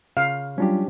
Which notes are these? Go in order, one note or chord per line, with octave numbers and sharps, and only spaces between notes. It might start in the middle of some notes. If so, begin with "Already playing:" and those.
C#3 F5
F#3 G3 C#4 D4 F4 G4